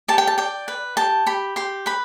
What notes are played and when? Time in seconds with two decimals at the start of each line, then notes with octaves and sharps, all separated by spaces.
0.08 G4 A5
0.18 G5
0.27 A5
0.38 D5 G5
0.68 B4
0.97 G4 A5
1.26 G4 B5
1.56 G4 C6
1.86 B4 B5